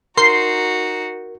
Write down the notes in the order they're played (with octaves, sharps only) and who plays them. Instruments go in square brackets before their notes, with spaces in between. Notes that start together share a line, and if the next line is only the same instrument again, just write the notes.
[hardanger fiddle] D#4 F#4 [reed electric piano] A#4 [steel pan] C6 [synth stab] C7